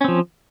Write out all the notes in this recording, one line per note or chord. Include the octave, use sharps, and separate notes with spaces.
F3 C4 C#4